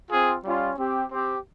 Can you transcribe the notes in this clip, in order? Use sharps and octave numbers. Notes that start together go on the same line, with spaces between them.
C4 F4 G#4
G3 C#4 F4
C4 G4
C4 G4